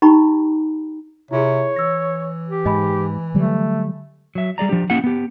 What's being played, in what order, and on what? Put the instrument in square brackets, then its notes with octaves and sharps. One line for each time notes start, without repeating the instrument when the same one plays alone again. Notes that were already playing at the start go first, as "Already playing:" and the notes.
[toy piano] D#4 G4 G5 A#5 B5 C#6
[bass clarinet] C3 [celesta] E4 F4 G#4 [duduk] C#5
[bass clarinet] E3 [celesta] E6 A#6
[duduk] G4
[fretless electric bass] G#2 [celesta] D#5 G#5 B5
[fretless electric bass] D3 F#3 G3 [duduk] A3
[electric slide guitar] F#3 E5
G3 G#4 D5 A#5
F3 D4 G4
A#3 C#4 E4 G4 F#5
B3 G4